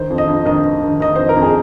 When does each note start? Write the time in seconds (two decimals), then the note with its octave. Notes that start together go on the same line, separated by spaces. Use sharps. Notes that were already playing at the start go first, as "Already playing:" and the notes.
Already playing: D#3 C5
0.10 F2
0.18 D#5
0.27 F2
0.45 D#3 D#5
0.64 D#3
0.83 D#3
1.00 D#3 D#5
1.16 F2 C5
1.29 A#4
1.36 F2
1.42 G#4